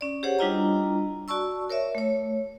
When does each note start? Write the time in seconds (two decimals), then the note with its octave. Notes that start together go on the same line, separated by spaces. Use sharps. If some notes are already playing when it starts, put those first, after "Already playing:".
0.01 C#4 D5
0.23 G4 G#4 C5 C#5 F#5
0.39 G3 D4 E4 F4 D#5 A#5
1.28 F#4 D5 A5 C#6 E6
1.70 A#4 C#5 D5 E5
1.95 A3 C#5